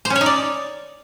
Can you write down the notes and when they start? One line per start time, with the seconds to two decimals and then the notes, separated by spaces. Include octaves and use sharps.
0.05 C5
0.10 C#4
0.16 C#5
0.21 D#4
0.26 D5